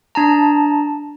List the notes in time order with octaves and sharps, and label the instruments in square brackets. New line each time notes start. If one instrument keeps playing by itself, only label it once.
[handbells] D4 A5 A#5